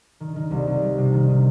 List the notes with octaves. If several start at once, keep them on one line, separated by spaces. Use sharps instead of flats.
D#3
D#3
C2
C2
G3
C3
D#3
D#3